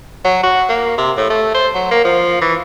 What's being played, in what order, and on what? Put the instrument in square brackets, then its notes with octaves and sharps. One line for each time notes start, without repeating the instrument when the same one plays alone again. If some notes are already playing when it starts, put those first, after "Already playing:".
[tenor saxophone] F#3
F#4
A#3
C3
A2
A3
C5
F#3
A#3
F3
E3